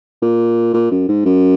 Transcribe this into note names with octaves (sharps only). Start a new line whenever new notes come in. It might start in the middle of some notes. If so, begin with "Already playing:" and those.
A#2
A#2
F#2
G#2
F#2